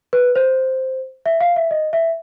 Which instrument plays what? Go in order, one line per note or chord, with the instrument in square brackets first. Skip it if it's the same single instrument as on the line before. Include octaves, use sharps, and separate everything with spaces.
[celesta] B4
C5
E5
F5
E5
D#5
E5